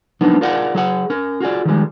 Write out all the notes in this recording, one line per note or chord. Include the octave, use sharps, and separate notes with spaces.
F3 F#3 A#3 B3 D4 D#4
F4 G#4 A#4 D5 F5 F#5
F#3 G#4 F#5
C#4 A#4
F4 F#4 G#4 D5
D#3 F3 G3 G#3